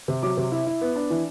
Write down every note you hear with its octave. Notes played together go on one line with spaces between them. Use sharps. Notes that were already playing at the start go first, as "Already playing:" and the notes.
C3
F#3 D6
C3
E4
E4
B3
D4
E3